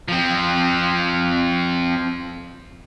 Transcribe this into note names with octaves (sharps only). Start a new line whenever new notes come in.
F3 C4